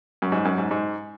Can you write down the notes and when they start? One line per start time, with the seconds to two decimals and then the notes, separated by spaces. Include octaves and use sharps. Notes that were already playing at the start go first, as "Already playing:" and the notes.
0.22 F#2
0.32 G#2
0.45 F#2
0.58 G#2
0.71 G#2